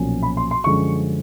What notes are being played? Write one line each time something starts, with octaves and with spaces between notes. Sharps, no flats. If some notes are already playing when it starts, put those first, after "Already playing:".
Already playing: B1 A#2 F3 A#3 C#4
B5
C6
C6
F#2 D3 F3 G#3 C#4 C#6